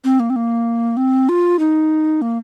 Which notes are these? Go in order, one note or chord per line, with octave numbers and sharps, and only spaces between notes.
C4
A#3
C4
A#3
C4
F4
D#4
A#3